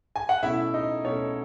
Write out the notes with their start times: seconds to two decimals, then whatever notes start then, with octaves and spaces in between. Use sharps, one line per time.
0.16 G#5
0.29 F#5
0.43 B2 A3 C#4 E4 E5
0.74 D#4 D#5
1.04 B2 A3 C#4 C#5